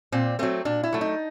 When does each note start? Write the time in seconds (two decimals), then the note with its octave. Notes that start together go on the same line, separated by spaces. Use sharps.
0.12 A#2 C4
0.39 F#3 A3 C4
0.65 A#2 D4
0.83 E4
0.93 F#3 A3
1.01 D#4